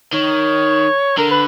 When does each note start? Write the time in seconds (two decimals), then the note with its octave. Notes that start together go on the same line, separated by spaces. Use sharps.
0.14 D#3 C#5
1.18 D3 A#4
1.31 B4